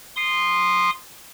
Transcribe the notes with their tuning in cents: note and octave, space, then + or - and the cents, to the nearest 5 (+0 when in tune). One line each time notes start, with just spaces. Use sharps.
C6 +0 D#6 -25